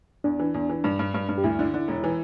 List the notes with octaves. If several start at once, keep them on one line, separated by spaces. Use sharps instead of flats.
E2 D4
E3
E2
E3
G2
G2
G2
G2
G4
D2 E4
D3
D3
E1
E3